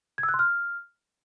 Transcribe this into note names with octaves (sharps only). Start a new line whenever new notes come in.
G#6
E6
F#6
C6
F6